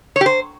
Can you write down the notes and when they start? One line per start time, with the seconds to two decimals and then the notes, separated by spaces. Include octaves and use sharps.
0.16 C#5
0.21 G4
0.26 C5